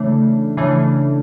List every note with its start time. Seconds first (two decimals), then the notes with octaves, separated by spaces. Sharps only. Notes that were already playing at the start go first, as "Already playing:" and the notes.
Already playing: C#3 E3 A3 D4
0.57 C#3 E3 A3 D4